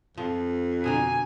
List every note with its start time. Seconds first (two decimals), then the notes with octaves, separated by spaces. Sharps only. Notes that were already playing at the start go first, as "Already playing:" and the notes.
0.18 F2 F3
0.84 B2 D3 A#3 G#5